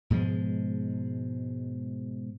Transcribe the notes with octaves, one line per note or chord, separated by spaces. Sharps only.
G#2 B2 F3 G#3